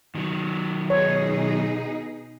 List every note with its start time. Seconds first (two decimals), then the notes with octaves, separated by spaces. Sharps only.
0.15 D#3 F#3
0.90 B2 D#4 G#4 C#5